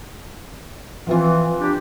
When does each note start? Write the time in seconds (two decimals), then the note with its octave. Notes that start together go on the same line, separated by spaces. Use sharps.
1.07 E3 F3 C4 F4
1.60 G3 D4 G4